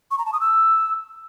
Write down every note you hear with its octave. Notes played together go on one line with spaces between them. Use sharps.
C#6
A#5
A5
D#6
E6